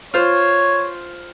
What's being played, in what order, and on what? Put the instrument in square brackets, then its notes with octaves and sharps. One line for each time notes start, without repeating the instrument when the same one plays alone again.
[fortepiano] F4 C5 [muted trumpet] C#5